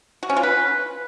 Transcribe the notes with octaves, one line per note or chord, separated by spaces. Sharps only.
F#4
C#4
F4
B4